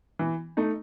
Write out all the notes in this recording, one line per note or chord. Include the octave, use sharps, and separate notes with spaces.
E3
A3 D#4